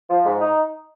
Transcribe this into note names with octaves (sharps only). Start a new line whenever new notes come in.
F3
G#2
D#4